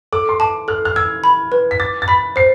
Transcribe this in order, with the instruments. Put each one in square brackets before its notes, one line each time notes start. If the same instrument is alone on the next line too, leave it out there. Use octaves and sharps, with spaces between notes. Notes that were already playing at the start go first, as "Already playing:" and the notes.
[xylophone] A4 [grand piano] D6
[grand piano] C6
[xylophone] A5 [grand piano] D6
[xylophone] A4 [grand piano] F6
[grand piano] F6
[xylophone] E6 [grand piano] G#6
[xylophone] B5
B4
[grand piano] B6
[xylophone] D6 [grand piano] A6
[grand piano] A6
[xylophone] B5 [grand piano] B6
[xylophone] C5 [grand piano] C7